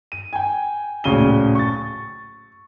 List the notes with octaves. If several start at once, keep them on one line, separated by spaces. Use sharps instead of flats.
D#7
G5 G#5
D1 A#1 C#3 D#7 G7
C#6 A6